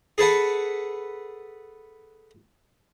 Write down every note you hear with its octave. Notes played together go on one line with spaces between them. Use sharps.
G#4 A4 B4 F#5